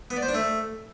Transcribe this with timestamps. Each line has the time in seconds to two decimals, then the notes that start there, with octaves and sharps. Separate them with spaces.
0.10 B3
0.16 D5
0.22 C5
0.28 D4
0.34 A3